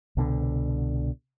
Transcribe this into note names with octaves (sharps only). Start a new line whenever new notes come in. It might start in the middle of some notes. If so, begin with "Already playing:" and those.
C2 B2 D3